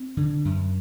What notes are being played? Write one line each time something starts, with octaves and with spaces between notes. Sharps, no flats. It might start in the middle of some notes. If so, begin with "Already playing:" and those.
Already playing: C4
D3
F#2